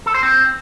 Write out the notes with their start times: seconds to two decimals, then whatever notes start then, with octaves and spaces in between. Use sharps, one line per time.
0.06 A4
0.14 C5
0.23 C4